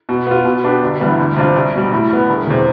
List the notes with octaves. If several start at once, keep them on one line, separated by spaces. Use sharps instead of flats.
B2
B3 F4
B2
B3 D4 G4
G1
G2 E3 G3 B3
D2
C3 G3 D4 F4
C2
B2 G3
A2
G3 B3
E1
E2 C3